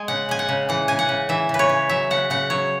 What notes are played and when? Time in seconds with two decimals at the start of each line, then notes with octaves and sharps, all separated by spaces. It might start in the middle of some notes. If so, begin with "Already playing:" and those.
Already playing: G#3 G#5
0.08 C#3 F#5
0.29 C#3 G#5
0.39 F#5
0.49 C#3
0.69 E3 F#5
0.88 C#3 G#5
0.99 F#5
1.09 C#3
1.29 E3 E5
1.49 C#3 B4
1.59 C#5
1.69 C#3
1.89 F#3 E5
2.10 C#3 F#5
2.30 C#3 F#5
2.50 F#3 C#5